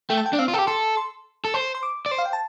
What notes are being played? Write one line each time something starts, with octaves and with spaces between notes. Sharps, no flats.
A3 G5
A5
G5
D4 D5
C4 F5
F4
A4 G5
G4
A4 C6
C6
A4
C5
C6
D6
D5
C5
F5
G5
A5